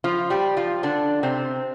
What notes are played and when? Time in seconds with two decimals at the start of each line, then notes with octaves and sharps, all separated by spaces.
0.04 F3 F4
0.30 G3 G4
0.57 F3 F4
0.83 D3 D4
1.23 C3 C4